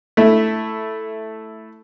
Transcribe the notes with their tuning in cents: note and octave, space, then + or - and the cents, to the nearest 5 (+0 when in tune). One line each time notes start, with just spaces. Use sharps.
A3 +0 E4 +0